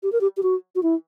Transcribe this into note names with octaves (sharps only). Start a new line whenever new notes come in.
G4
A#4
G4
G4
F#4
F#4
E4